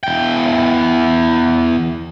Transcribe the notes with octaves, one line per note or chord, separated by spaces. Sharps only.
E2 G5